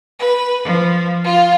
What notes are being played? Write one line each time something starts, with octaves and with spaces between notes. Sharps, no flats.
B4
F3
F4